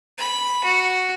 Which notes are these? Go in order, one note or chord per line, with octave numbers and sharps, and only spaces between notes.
B5
F#4